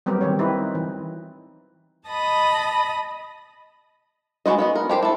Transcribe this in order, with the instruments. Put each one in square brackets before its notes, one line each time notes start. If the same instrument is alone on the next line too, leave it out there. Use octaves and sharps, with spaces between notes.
[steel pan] F#3 G3 B3 C4 G4 A#4
D#3 C4 C#5
C4 D#4 E4 B4
E3
[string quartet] D#5 A5 B5 D#6
[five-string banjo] G#3 B3 F#4 C5 D#5
B3 C#5 D#5
A#4
F3 G4 G#4 C5
E4 A4